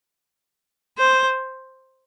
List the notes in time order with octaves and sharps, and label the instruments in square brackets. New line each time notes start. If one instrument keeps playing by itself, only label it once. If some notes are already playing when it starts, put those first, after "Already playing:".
[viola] C5